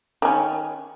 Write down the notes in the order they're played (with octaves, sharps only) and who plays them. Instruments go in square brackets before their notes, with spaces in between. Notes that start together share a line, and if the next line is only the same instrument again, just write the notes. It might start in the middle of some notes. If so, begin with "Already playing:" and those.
[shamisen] D#3 C#4